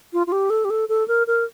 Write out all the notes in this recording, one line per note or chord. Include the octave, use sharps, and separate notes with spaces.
F4
F4
G4
A4
G4
A4
A4
A#4
A#4